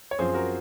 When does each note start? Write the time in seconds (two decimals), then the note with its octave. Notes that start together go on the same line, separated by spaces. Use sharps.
0.11 C#5
0.19 F#2 F3 C4 G#4 C5
0.34 F#4 A#4